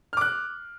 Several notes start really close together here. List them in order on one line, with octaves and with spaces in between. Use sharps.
F6 D6 F#6